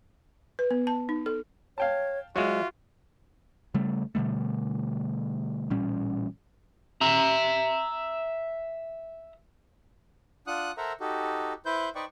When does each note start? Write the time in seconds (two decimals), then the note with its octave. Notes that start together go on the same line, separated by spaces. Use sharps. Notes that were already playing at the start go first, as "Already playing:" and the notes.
0.59 B4
0.71 B3
0.87 A5
1.09 D#4
1.26 A4
1.78 C#5 F5 G5 A5
2.36 F#3 G#3 F4 F#4 E5
3.74 C#3 G3 A3
4.15 B2 D3 G3 A3
5.70 A1 A#2 G3 C#4
7.01 E5 A#5
10.47 D4 F4 F#5 D#6 F#6
10.77 A4 A#4 C5 E5 F#5 A#5
11.00 D#4 F#4 G4 A4
11.66 E4 B4 C5 G6
11.95 D#4 B4 C5 D5 G5 C#6